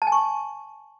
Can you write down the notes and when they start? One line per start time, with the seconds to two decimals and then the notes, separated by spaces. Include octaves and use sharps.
0.02 A5
0.07 G#5
0.12 C#6